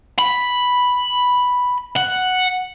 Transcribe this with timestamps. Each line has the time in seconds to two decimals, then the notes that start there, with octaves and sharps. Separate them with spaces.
0.19 B5
1.96 F#5